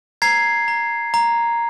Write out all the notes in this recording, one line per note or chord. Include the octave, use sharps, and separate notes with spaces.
A#5 G#6 C7
A#5
A#5